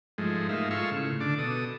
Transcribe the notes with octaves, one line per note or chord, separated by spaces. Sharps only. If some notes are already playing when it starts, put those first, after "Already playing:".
G#2 F3 G#3 A3
G#2 A#3 D#4 E5 F5
G#3 A3 F4 F5 C#6 E6
A2 C#3
D3 D4 D6
B2 A4 D#6